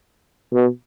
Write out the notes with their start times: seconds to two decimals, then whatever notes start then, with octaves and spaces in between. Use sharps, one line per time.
0.52 B2